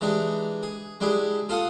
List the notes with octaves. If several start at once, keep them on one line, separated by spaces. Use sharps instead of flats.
E3 G#3 D4 D#4 G4
G#4
G#3 D4 E4 G4 G#4
F4 A4 F5 F#5 D#6